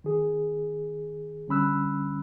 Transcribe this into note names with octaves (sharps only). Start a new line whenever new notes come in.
D#3 G#4
D3 G3 C#4 B5 E6 F#6